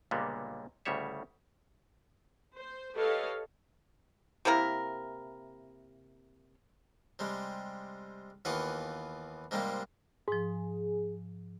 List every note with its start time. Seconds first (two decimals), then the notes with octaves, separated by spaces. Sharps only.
0.11 C#2 A#2 D3 G3 A#3 B3
0.85 D2 A2 C#3 G3 C#5 E5
2.55 C5
2.96 G4 A4 B4 C#5 D#5 F5
4.45 C3 A#3 E4 A#4
7.19 C3 G3 G#3
8.45 D#2 E3 B3 F4 F#5
9.51 G#2 C3 G3 G#3 A#3
10.28 G#2 F3 G#4